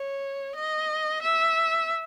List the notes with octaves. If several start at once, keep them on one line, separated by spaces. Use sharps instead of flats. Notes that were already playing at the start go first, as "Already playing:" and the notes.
Already playing: C#5
D#5
E5